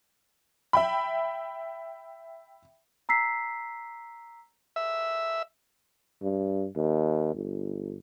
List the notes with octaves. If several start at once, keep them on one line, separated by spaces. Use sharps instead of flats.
E5 G5 B5
A#5 E6 B6 C7
E5
G2
D#2
G1